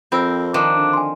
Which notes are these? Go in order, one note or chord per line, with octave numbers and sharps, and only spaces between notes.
F2 C4 A#4 B5 E6 G6
D#3 F3 D4
D3
G#5 C6